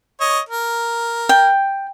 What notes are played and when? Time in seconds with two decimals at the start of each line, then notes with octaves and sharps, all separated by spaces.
0.20 C#5 D#5
0.49 A#4
1.29 G5